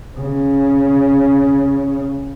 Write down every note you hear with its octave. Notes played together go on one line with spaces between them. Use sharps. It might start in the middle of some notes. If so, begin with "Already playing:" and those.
C#3